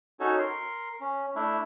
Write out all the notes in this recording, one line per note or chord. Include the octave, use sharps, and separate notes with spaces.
C#4 D#4 F#4 A4 C#5
A#4 C6
C#4
A3 D4 E4